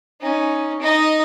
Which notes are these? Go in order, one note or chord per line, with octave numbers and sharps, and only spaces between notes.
C#4 D#4
D#4 D#5